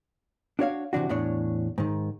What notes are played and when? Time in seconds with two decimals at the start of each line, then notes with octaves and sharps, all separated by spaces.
0.59 D4 F#4 C#5 F5
0.93 C3 E3 D4 F#4
1.09 E2 A2 D4 C#5
1.78 G#2 D#3